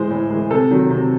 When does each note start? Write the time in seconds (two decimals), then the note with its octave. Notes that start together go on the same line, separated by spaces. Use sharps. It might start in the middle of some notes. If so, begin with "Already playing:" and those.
Already playing: A2 E3 G#3 C5
0.11 A2
0.30 E3 G#3
0.50 C3 A4
0.71 D#3 F#3
0.90 C3